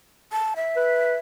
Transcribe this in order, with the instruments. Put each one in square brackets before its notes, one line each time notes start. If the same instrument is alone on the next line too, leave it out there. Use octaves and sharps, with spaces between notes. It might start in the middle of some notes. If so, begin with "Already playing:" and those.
[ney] A5
E5
[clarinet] B4